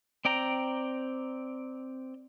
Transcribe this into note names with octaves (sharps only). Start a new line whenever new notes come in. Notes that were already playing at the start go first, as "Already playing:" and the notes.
C4 D5 G5 A#5